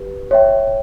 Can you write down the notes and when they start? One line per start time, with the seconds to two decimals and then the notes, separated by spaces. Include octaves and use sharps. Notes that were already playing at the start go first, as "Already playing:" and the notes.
Already playing: G4 B4
0.31 C#5 E5 G5